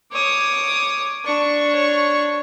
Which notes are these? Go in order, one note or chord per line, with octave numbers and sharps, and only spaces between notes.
C#5 D6 D#6
D4 C#6
C#5